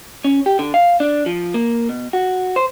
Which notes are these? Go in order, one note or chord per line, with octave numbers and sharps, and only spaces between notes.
C#4
G4
D3
F5
D4
F3
A#3
B2
F#4
C5